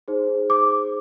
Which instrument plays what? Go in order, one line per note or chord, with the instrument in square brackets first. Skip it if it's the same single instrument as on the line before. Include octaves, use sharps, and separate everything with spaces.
[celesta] D#4 G#4 C5
D6